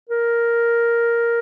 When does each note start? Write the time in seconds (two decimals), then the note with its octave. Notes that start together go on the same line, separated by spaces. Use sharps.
0.10 A#4